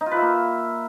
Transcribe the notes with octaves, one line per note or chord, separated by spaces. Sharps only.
D#4
F4
B4
E5
A#3